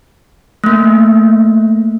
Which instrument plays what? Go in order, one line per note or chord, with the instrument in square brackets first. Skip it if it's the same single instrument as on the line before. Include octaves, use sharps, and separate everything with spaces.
[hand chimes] A3 A#3